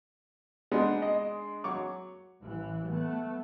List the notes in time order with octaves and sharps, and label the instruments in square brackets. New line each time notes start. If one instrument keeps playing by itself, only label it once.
[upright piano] G#3 D4 [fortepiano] B3 D#4
[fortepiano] D#5
F#3 C#6 D6
[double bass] A1 E3
A3 B3